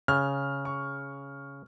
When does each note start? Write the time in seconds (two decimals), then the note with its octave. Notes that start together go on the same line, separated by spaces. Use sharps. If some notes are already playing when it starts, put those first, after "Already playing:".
0.08 C#3 F6
0.65 C#6